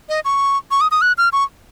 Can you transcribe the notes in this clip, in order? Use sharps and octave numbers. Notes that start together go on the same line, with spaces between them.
D#5
C#6
C#6
D#6
D#6
F#6
F6
C#6